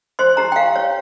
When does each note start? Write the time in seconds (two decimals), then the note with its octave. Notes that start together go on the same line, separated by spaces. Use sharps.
0.19 C5 C6
0.37 G4 A#5
0.52 G5
0.56 G4 F5
0.76 C#5